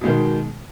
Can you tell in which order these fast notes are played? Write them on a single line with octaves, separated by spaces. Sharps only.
B2 G#3 D#3